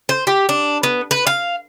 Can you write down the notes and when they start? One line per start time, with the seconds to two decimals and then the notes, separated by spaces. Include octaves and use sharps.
0.09 C5
0.27 G4
0.49 D4
0.83 B3
1.11 B4
1.27 F5